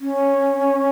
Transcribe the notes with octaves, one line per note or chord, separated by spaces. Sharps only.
C#4